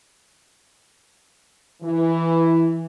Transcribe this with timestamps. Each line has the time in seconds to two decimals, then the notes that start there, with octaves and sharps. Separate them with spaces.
1.82 E3